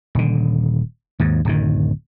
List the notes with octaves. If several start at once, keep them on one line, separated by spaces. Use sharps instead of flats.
D#1 D3
D#2 G#2
D1 F#2 D#3